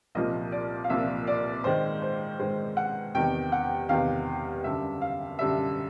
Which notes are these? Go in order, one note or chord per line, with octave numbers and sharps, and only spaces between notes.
C2 A#2 F3 A#3 D#5
D5
F5
C2 A#2 F3 A#3 E5
D5
G#2 D#3 G#3 C5
C5
G#2 D#3 G#3 C5
F#5
E2 C3 D#3 G5
F#5
E2 C3 D#3 F5
F#2 D3 G3 E5
F5
F#2 D3 G3 E5